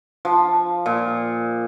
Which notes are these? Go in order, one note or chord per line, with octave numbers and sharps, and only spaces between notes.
F3
A#2